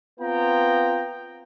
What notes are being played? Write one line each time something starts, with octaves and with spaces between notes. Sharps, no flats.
B3 C4 F4 G5 A#5